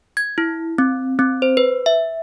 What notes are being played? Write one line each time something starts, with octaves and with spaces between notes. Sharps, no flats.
G#6
E4
C4
C4
C5
B4
E5